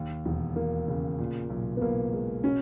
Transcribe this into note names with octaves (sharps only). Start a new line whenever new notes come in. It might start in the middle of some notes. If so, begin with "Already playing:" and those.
Already playing: D#2
E1
E1 A#3
C#3
A#2
B1
B3
B1 A#3
G#3
B2 C#4